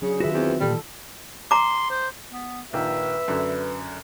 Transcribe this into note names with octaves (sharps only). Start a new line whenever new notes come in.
C#3 F#3 D4 G#4
D#3 F4 F#4 B4 E5
E2 C4
A#2 D#3 E3 G3 A4
A#5 C6 D6
C5
B3
A#1 D#3 B4 E5
F#2 D3